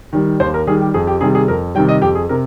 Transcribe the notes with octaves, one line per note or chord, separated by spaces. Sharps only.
D#3 G3
D#2 C5
A#4
D#3 G3 G#4
G4
F2 G#4
G4
C3 D#3 G3 G#4
G#4
F2 A#4
C3 D#3 G3 G5
D#5
F2 G4
G#4
C3 A#4